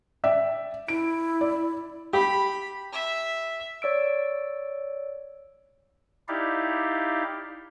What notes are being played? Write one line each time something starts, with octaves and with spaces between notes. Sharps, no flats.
D5 E5 G5
E4 D7
D5
G4 B5
E5
C#5 D5 E6 D7
D#4 E4 G4 D5 F5